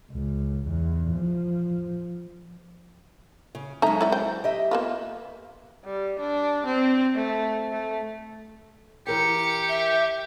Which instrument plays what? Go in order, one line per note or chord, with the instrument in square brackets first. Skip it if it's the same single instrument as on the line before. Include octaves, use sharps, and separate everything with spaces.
[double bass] C#2
E2
F3
[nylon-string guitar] C#3
[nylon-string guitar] F#3 G#3 E5 [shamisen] D#4 A4 A#5
[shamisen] E4 D5 G5
C5 G5
[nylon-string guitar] G4 D#5 E5
[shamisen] A#3 B3 F4
[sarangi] G3
D4
C4
A3
A3
[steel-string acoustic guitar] E3 A#4 G5 [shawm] G4 [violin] C#7
[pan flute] E5